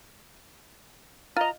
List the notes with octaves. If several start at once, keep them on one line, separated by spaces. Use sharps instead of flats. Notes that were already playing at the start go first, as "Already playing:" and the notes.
F4 D#5 A#5